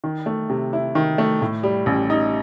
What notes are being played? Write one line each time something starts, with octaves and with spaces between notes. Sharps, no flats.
D#3
A3
C3
E4
D#3
A3
A2
G3
A1
D#4